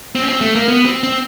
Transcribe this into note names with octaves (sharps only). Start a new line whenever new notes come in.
C4
C#4
C4
A3
A#3
B3
C4
C4